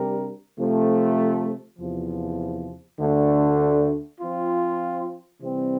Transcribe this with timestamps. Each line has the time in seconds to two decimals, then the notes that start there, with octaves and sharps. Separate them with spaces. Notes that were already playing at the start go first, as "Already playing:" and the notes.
Already playing: C3 G3 D4 G4 A#4
0.58 C3 F3 A3
1.79 E2 C3 F3
3.00 D2 D3 A3 D4
4.21 F3 C4 F4
5.41 C3 E3 G3 C4